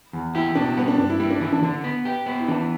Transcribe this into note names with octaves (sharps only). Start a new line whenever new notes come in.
E2
E4 G4
B2 D4
G3 B3
D4
G2 D4
E4
G3 E4
D4
E3 E4
D4
D3 D4
B3
G4
B3
E4
E3 D4